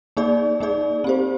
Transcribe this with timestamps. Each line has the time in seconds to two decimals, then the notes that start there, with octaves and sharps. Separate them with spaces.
0.17 A#3 D#4 G#4 D5
0.60 A#3 D#4 G#4 D5
1.04 C4 G4 C5